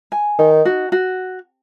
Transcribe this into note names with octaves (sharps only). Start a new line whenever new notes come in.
G#5
D#3 D#4
F#4
F#4